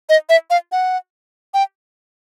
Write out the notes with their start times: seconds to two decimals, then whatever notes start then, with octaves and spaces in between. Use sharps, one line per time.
0.09 D#5
0.29 E5
0.50 F5
0.72 F#5
1.54 G5